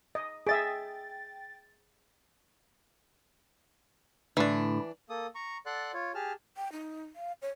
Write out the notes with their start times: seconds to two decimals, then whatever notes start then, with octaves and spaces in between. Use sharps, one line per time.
0.15 D#5
0.47 G#4 D#5 E5 G5 A6
4.37 A2 D3 E3 D4
5.10 A#3 A4 D#6
5.35 A#5 C#6
5.66 A4 D5 F#5 C6 F#6
5.94 F4 C#5
6.15 G4 G#4 A5 F6
6.57 G5
6.72 D#4
7.16 F5
7.42 C#5